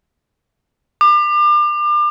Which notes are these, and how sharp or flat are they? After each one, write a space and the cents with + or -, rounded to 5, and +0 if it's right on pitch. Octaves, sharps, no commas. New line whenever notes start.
D6 +35